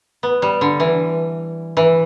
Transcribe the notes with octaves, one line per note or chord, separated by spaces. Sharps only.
B3
G3
D3
E3
E3